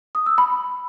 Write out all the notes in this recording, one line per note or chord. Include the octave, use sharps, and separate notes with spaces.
D#6
E6
B5